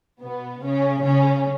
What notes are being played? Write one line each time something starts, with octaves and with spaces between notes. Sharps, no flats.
B2 B3
C#3 C#4
C#3 C#4